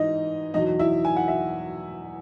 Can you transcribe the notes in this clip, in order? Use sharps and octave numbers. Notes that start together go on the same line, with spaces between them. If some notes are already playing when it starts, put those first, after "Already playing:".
Already playing: G#2 E3 D#4 D#5
E2 B2 F#3 D#4 D#5
E4 E5
G#5
F#5
E5